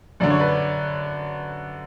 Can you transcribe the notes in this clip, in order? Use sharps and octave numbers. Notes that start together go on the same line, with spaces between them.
F#2 D3 D5
C#5
B4 D5